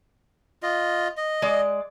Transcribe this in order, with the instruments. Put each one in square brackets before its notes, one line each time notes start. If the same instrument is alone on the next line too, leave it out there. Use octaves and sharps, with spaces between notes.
[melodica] F4 D#5
D#5
[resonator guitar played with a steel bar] G#3 D5